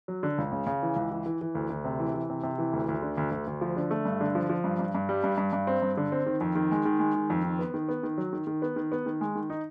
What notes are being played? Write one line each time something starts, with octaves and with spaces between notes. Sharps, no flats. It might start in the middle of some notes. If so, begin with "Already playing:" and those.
F#3
D3
C#2
C#3
C#3
E3
C#2
E3
E3
E3
D2
D2
C3
E3
E3
C3
C3
E3
D2
D2
D3
D2
D2
D2
F3
D3
A3
G2
D3
F3
F3
G2
G2
G2
G3
G2
G2
G2
C4
G2
D3
C4
D#3
F2
D#3
G#3
D#3
G#3
D#3
F2
D#3
B3
D#3
B3
D#3
F#3
D#3
D#3
B3
D#3
B3
D#3
G#3
D#3
D#4